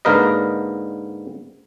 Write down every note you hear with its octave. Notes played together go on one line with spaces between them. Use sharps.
G#2 D3 A#3 A#4 B4 D#5